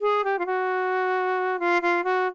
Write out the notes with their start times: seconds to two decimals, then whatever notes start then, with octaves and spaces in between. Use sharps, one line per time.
0.01 G#4
0.24 G4
0.38 F4
0.46 F#4
1.59 F4
1.82 F4
2.04 F#4